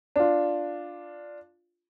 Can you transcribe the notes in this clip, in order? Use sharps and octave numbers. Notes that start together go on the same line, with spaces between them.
D4 F4